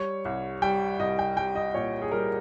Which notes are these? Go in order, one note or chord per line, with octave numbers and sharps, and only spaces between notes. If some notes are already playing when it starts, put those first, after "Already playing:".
Already playing: G3 C#5
C2
G3 G5
C2 D#5
G5
G3 G5
D#5
A#2 C#5
G#4
G3 A#4